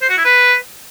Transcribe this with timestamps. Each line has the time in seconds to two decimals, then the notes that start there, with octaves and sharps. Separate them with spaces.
0.02 C5
0.10 F#4
0.17 E4
0.25 B4